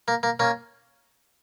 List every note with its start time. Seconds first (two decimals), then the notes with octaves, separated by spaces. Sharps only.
0.08 A#3
0.23 A#3
0.39 A#3 C#4